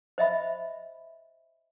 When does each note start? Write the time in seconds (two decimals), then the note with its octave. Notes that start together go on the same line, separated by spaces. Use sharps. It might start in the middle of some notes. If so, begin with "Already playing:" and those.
0.18 C5 D#5 E5 B5